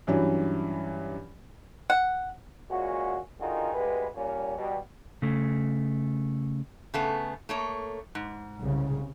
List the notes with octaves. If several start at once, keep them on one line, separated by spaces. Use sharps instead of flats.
G2 E3 F#3 C#4
F#5
A#2 G#3 C#4 F#4
D3 D#3 D#4 F4 F#4 G#4
D2 G#3 G4 B4
A#2 G3 C#4
B2 G3
C#3 A3
C#3 A3 B3
A3 A#3 C#5
G#2
C2 C#3